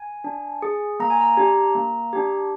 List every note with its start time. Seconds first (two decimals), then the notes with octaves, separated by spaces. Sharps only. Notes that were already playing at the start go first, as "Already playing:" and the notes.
Already playing: G#5
0.24 D4
0.62 G#4
1.00 A#3 A#5
1.10 G#5
1.21 A#5
1.37 D4 G4
1.75 A#3
2.13 D4 G4